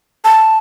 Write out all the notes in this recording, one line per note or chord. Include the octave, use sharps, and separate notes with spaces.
A5